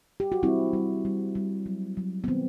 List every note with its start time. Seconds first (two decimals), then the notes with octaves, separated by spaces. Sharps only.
0.20 G4
0.32 F#4
0.43 G3 C4 E4
0.73 G3
1.05 G3
1.35 G3
1.66 F#3
1.97 F#3
2.24 B3
2.28 D#3 C4